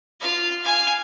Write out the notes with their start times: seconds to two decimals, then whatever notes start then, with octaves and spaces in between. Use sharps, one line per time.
0.20 F4 F5
0.64 F5 G#5